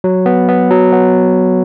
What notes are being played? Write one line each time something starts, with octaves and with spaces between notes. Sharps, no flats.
F#3
B3
B3
F#3
B3